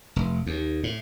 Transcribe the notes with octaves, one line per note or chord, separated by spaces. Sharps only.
F1
D#2
A2